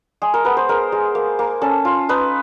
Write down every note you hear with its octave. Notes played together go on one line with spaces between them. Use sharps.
G#3 G#4
A#4
B3 B4
C5
G#3 A#4
G#3
A#3
A#3
C#4 A4
F4
D#4 B4